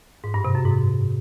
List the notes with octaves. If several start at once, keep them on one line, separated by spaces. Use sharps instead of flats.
G#2
G2
C3
F#2
G#2